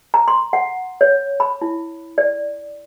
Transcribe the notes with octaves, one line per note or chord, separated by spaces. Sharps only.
A#5
C6
F#5
C#5
B5
E4
D5